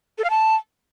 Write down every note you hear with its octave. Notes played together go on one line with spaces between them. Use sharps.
A4
F5
A5